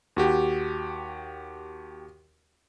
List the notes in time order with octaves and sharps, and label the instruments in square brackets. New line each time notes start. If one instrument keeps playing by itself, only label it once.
[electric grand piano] D#2 F#4 G4